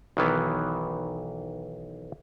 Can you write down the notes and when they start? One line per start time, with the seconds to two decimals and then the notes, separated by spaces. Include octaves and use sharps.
0.17 B1 D#3 E3 B3